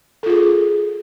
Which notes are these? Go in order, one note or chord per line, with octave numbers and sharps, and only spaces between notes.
F4 G#4 A4